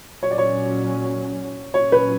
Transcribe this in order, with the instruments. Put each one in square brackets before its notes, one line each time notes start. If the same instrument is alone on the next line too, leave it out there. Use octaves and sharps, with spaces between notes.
[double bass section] A#2 F#3 C#4 [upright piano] C#5
[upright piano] D5
C#5
[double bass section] A#2 F#3 C#4 [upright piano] C#5
[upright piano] B4